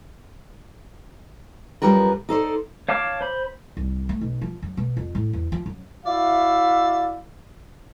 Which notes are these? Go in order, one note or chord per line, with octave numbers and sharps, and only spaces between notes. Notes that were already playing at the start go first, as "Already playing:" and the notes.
F#2 B2 F3 G3 A#4 B4
D#4 A4 C5 D5
C#5 F5 A5 D6 F6
C5 B5
C2
A3
B1
F3
F#2
B2
F2
A2
E2
F3
F#2
E4 F#4 D5 E5 F5